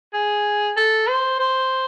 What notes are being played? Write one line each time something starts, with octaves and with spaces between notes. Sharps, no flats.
G#4
A4
C5
C5